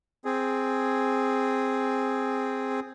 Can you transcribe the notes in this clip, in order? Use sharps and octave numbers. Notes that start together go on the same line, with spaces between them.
C4 G#4